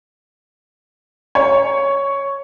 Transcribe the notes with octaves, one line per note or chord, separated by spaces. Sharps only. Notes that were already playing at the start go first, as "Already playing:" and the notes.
C#5